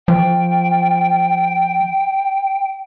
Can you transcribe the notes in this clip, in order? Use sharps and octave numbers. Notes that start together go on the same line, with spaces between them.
F3 G5